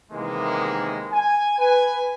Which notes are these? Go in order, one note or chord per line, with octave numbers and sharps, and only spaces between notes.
C3 D#3 E3 G#3 A#3 B3
G#5
B4 G#5